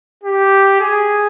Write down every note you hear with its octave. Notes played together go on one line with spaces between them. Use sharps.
G4
G#4